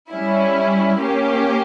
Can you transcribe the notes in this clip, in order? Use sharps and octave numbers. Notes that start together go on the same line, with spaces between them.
G3 C#4 E4
A#3 C#4 G4